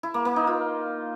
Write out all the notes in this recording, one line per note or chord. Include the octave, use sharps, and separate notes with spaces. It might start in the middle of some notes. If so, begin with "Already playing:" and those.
E4
A#3
A#3
D#4
F4